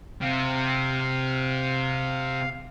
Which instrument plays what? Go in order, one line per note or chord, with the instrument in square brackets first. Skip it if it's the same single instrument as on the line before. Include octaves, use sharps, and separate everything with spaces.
[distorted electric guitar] C3 [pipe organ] F5